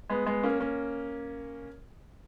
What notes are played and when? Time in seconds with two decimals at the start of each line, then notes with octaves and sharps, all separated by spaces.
0.10 G#3 B3
0.26 G#3 B3
0.43 A#3 C#4
0.60 A#3 C#4